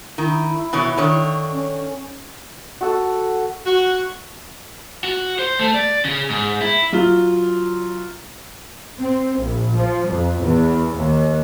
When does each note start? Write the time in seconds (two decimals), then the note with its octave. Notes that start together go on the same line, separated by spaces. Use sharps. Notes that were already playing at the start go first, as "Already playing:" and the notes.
0.18 D#3 E4
0.73 B2 E3 C#5
0.97 D3 D#3 C#5
1.53 C#4
2.81 F#4 A4 F#5
3.66 F#4
5.04 F#4
5.39 C5
5.59 A3
5.74 D5
6.05 C#3
6.30 G#2
6.61 E4
6.92 F#3 F4 G7
8.99 C4
9.39 A#1
9.75 F3
10.10 F2
10.41 E2
10.97 D#2